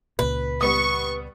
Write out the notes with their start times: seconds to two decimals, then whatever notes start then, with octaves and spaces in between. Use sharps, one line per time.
0.19 C#2 A#2 B4
0.61 G3 B3 C#6 D#6